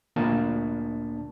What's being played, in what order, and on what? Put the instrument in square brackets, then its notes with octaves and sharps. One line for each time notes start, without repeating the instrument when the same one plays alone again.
[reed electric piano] D2 A#2 A#3 D4 A5